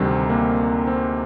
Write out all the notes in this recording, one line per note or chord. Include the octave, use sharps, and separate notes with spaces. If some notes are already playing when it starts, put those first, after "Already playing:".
Already playing: D2 C3 D#3 G3 C4
A#3
C4